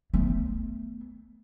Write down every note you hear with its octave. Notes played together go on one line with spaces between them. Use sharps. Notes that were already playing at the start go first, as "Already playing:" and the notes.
A3 B3